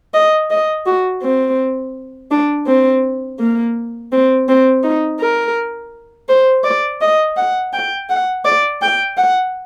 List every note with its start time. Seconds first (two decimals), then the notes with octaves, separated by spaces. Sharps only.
0.14 D#5
0.51 D#5
0.86 F#4
1.23 C4
2.31 D4
2.67 C4
3.39 A#3
4.12 C4
4.49 C4
4.83 D#4
5.20 A#4
6.29 C5
6.64 D5
7.01 D#5
7.37 F#5
7.74 G5
8.10 F#5
8.45 D5
8.82 G5
9.18 F#5